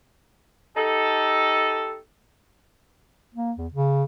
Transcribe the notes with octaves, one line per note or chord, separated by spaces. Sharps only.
D#4 G4 A4
A#3
E2
C#3